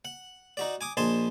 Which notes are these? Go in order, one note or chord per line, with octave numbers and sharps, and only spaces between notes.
F#5
D#4 F#4 D5
G#5 D6 D#6
A#1 D#5 G#5 A5 C6